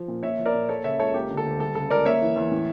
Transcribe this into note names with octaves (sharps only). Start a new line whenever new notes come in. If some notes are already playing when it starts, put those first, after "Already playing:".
Already playing: F3
A#2
A#2 C#5 E5
F3
A#4 D5
A#2
A#3 A4 C#5
C#3 C#5 E5
C#2 A4 C#5
A#3 G4
D3
A4
D2
G3 A4
C#3 A4
C#2 A#4 D5
A#3 C#5 E5
E3
E2
A2